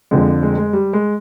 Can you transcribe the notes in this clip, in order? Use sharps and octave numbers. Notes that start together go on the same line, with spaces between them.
F2 D3 F3 G#3
G#3
G#3
G3
G#3